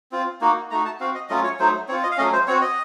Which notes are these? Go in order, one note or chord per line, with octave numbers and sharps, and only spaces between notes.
C4 F4
A#3 D#4 F#4
A3 D#4 F#4 A#5
A5
C4 F#4 F5
D#5
F#3 A3 C#4 F4 D#5
C#5
F#3 A3 D#4 C5
C4 F4 C#5
D#5
F5
F#3 A3 C#4 D#5
C5
C4 F#4 C#5
D#5